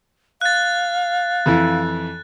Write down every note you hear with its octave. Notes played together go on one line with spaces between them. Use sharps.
F5 F#6 A6
F2 E3 E4